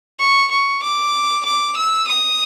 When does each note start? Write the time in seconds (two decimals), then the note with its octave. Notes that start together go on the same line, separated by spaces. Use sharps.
0.19 C#6
0.51 C#6
0.83 D6
1.45 D6
1.76 E6
2.07 D#6